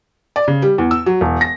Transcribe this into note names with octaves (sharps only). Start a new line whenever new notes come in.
D5
C#3
G3
E2
E6
F#3
E1
A#6